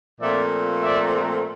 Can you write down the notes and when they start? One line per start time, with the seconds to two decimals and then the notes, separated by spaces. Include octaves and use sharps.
0.21 A#2 F3 A3 C4 D5 E5
0.83 D5 E5